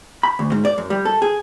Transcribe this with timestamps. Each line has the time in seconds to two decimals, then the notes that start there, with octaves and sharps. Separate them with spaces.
0.23 B5
0.39 D2
0.52 G#2
0.65 D5
0.78 F#2
0.90 G3
1.05 A4
1.22 G#4